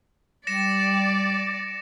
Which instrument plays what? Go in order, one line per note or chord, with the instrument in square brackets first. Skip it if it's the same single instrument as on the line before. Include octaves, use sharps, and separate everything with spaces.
[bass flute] G3 [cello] D5 [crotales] A#6 C#7 E7